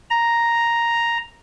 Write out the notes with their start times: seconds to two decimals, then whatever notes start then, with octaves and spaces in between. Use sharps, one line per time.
0.10 A#5